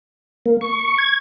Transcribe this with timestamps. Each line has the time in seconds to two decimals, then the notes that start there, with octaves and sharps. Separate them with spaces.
0.46 A#3
0.61 C#6
0.98 G#6